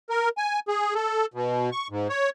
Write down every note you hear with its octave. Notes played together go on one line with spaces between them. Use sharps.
A#4
G#5
G#4
A4
B2
C#6
G#2
C#5